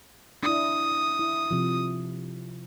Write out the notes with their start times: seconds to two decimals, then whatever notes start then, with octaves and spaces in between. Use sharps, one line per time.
0.43 D4 E4 D#6
1.19 E4
1.51 C3 F3